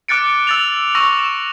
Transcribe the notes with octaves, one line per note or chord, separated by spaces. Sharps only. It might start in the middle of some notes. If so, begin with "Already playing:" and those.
D6 F6 F#6 A6 C#7 D7
E6 A6 F7
C#6 E6 A#6
E7